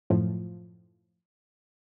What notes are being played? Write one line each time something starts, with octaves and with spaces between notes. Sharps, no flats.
F#2 A2 F3